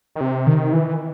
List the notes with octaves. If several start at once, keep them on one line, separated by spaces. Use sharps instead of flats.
D#3
C3
D#3
E3